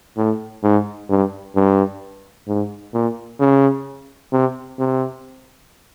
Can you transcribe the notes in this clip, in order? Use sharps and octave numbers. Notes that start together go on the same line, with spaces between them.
A2
G#2
G2
G2
G#2
A#2
C#3
C3
C3